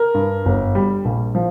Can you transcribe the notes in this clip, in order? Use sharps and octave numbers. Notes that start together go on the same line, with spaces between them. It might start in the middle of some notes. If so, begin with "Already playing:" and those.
Already playing: A#4
G2
G1
G3
A#1
F3